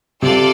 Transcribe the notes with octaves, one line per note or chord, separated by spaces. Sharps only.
C3 F4 A4 D5